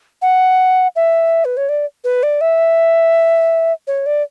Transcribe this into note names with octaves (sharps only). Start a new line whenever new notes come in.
F#5
E5
B4
C#5
D5
B4
D5
E5
C#5
D5